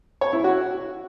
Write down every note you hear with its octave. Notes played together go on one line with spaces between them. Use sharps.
C#5
E4
F#4